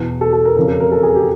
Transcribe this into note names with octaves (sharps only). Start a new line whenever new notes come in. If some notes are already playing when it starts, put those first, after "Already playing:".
Already playing: E2 B2
A4
A4
A#4
F2 C#3 E3 A#4
A4
A#4
A4
G#4
G4